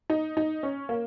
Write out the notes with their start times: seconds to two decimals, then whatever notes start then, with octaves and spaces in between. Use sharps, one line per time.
0.10 D#4
0.37 D#4
0.63 C#4
0.89 A#3